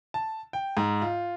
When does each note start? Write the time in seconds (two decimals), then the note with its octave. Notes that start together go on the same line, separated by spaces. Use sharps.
0.14 A5
0.53 G5
0.77 G#2
1.02 F4